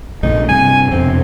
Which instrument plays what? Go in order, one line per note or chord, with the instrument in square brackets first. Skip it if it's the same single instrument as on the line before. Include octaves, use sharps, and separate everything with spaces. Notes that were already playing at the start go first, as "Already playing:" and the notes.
[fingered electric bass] A#1 A2 C#3 [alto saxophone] D#4
[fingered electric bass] G2 C3 [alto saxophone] G#5
[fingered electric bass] E1 F2 C3 [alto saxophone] C4